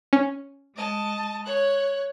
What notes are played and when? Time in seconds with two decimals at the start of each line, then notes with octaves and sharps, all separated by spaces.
0.13 C#4
0.75 G#3 D#5 A5
1.45 C#5 F#6